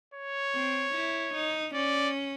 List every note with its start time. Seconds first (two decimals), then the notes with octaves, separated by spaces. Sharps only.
0.14 C#5
0.55 C4
0.94 E4
1.34 D#4
1.74 C#4 D5